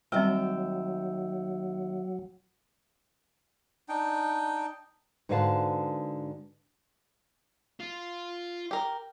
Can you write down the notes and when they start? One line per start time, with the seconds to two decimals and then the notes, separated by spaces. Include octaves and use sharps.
0.12 D#2 F#3 G3 C4 E5 G5 E6
3.89 D4 D#4 G5
5.29 G#2 D3 F#4 B4 F5 A5
7.80 F4
8.71 G4 A#4